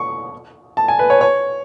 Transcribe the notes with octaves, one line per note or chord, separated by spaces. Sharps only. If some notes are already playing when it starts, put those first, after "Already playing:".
Already playing: C#6
A5
G#5
B4
C#5
C#5